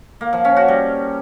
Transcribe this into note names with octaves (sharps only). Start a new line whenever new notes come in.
A#3
F3
C#4
F#4
G3